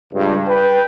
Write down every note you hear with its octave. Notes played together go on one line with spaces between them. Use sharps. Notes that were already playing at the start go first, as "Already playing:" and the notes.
C#2 G2
B4 G5